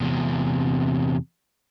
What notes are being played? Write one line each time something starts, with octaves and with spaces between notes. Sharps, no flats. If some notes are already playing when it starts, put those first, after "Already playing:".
E2 C3